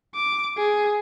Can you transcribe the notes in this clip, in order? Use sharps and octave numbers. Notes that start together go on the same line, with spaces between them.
D6
G#4